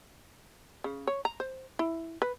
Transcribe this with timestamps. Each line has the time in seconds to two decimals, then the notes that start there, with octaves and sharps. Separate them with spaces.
0.84 C#3
1.07 C#5
1.25 A#5
1.40 C5
1.79 E4
2.22 B4